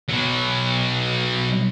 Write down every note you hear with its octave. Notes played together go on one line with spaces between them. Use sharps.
B2 F#3